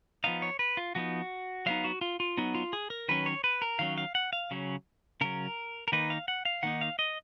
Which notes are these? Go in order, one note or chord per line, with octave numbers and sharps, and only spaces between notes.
F3 B3 D#4 F5
C#5
B4
F4
F3 B3 D#4 F#4
F#3 B3 D#4 F5
F#4
F4
F4
F#3 B3 D#4
F4
G#4
A#4
D#3 F#3 C#4 B4
C#5
B4
A#4
D#3 F#3 C#4 F5
F5
F#5
F5
C#3 F#3 C#4
C#3 F#3 C#4 A#4
A#4
D#3 A#3 D#4 B4
F5
F#5
F5
D#3 A#3 D#4 F#5
F5
D#5